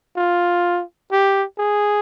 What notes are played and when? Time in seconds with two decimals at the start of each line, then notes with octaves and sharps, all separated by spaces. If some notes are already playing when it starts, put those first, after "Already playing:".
0.17 F4
1.12 G4
1.58 G#4